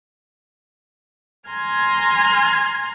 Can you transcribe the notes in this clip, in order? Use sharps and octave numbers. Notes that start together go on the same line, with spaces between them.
G#5 A#5 C6 F6 G#6